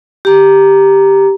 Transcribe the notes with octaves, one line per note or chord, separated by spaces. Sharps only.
G4 A#5